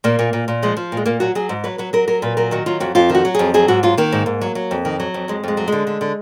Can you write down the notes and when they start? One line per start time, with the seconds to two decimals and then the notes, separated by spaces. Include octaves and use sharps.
0.04 A#2 A#3
0.19 A#2
0.33 A#2
0.48 A#2
0.63 F3 G#3
0.77 F3
0.92 A#2
0.97 G#3
1.06 A#2 A#3
1.20 F#3 F#4
1.35 F#3 G#4
1.49 G#2
1.64 F#3 B4
1.78 F#3 B4
1.93 F#3 A#4
2.08 F#3 A#4
2.22 A#2 B4
2.37 F#3 A#4
2.51 D#3 F#4
2.66 F#3 F4
2.80 F2 F#4
2.95 F2 F4
3.10 D#3
3.15 F#4
3.25 F#3
3.35 F2 G#4
3.54 F#3 G#4
3.68 G#2 F#4
3.83 F#3 F4
3.97 D#3 A#3
4.12 G#2
4.26 G#2
4.41 F#3
4.55 F#3
4.71 F2
4.85 D#3
5.00 F#3
5.14 F2
5.28 F2 G#3
5.43 F2 G#3
5.57 F#3
5.68 D3 G#3
5.87 D3
6.01 D3